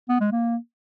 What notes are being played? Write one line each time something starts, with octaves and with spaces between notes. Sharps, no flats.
B3
G#3
A#3